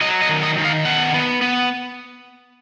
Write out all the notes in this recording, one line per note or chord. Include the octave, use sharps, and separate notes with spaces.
F#3 D#5
D#5
D#3
D#5
D#3
F5
B3 F#5
B3
B3